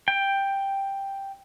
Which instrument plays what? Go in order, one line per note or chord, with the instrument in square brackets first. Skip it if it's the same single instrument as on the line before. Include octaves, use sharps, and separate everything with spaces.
[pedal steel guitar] G5